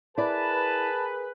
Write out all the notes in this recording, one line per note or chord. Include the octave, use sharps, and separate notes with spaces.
E4 G#4 A#4 B4 D5 A5